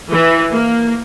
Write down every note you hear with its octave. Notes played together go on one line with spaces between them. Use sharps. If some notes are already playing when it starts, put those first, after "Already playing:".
E3
A#3